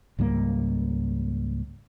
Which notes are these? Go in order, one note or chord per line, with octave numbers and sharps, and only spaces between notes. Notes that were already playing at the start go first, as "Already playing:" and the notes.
C#2 G#2 G3 A#3